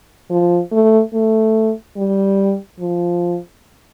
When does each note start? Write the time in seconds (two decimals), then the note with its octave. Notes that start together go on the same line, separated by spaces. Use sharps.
0.30 F3
0.72 A3
1.14 A3
1.97 G3
2.80 F3